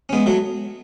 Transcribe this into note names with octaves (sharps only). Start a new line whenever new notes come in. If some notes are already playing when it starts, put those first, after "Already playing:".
C#4
G#3 B3
F#3 A3